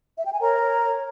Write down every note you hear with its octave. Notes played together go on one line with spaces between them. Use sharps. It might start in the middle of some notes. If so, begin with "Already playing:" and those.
E5
G5
G#5
A#4 C#5 A#5
C#5
C#5